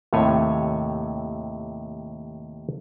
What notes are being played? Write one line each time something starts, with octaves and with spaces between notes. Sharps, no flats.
D#2 A2 C3 A3 C#5 G#5